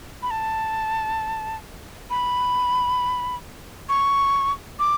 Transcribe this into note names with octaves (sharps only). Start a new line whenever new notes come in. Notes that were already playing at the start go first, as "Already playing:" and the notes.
B5
A5
B5
C#6
D6